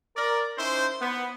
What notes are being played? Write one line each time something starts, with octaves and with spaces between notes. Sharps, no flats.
A#4 D5
C#4 D#4 E4 C5
B3